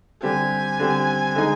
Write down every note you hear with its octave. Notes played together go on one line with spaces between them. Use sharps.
D3 G3 C4 G4 G#5
D3 G3 C4 G4
D3 G#3 D#4 G#4